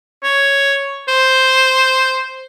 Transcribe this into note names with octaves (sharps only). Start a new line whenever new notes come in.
C#5
C5